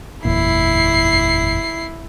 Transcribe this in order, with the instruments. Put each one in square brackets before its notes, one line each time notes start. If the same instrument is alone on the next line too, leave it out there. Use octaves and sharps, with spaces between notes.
[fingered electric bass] F#1 E2 A#2 [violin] E4 C7